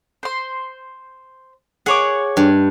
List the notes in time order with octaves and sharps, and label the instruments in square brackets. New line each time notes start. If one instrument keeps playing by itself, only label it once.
[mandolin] C5 C6
[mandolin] G#4 C#5 D6 [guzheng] F#5
[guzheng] G2